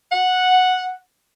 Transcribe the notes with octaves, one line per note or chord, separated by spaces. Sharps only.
F#5